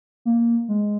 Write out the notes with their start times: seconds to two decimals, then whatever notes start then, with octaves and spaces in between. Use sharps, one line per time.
0.25 A#3
0.69 G#3